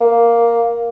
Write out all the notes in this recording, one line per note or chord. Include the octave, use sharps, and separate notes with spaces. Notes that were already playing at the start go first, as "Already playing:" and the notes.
A#3